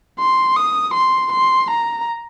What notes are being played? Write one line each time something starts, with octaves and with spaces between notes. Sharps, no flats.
C6
D#6
C6
C6
A#5